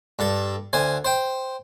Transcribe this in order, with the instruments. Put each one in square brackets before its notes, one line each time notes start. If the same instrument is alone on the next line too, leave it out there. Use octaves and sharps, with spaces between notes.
[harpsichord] G2 A4
D2 C5 G#5
C5 G5